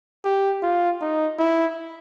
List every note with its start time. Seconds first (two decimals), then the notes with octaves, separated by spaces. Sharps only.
0.25 G4
0.63 F4
1.01 D#4
1.39 E4